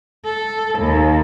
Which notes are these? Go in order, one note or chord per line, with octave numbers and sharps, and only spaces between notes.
A4
D#2